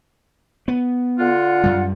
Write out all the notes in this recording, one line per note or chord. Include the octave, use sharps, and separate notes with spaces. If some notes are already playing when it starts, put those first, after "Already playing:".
B3
D3 F4 F#5
F#2 G3